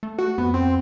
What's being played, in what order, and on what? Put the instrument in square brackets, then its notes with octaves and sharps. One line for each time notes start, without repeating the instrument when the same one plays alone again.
[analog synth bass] A3
[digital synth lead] F#4
[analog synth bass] F2 [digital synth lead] B3
[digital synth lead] C4